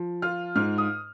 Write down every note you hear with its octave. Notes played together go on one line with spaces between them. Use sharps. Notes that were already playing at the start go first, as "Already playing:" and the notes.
Already playing: F3
F4 F6
G#2 F6
D#6